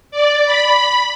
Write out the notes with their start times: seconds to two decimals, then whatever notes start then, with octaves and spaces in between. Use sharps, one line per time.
0.11 D5
0.45 B5